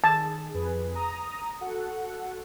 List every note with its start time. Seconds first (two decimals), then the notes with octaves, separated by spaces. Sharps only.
0.04 D#3 G#4 A5
0.54 F2 G#4 B4
0.95 A#5 D#6
1.61 F#4 A4 F#5